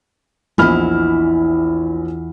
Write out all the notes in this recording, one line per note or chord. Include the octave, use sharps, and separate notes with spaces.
A#1 E2 E4 D#5 B5 F6